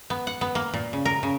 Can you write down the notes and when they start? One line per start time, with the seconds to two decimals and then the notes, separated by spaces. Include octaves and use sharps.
0.10 B3
0.27 F#5
0.41 B3
0.55 A#3
0.74 A#2
0.93 C#3
1.05 A#4
1.23 C#3